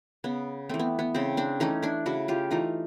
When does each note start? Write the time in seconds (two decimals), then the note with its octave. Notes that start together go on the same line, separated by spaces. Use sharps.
0.24 C#3 B3
0.69 E3 A3 C4
0.79 B3
0.99 B3
1.15 C#3 C4
1.37 C4 D4
1.60 E3 A3 C#4 D#4
1.82 D4 E4
2.06 C#3 E4 F#4
2.28 F4 G4
2.51 E3 A3 D#4 F4